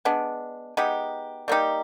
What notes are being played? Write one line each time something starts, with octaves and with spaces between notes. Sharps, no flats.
G#3 B3 D4
G#3 B3 D#4 G4
G3 A#3 D#4 G4